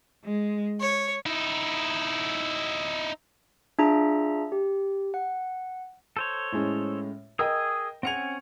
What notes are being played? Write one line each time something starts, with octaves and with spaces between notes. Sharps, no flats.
G#3
C#5
D#4 E4
D4 F4 G#4 E5 A#5
G4
F#5
A4 C5 C#5
A2 G#3 C#4
G#4 A#4 D#5 G5 D#6 E6
C4 C#4 F#5 G#5 C#7 F7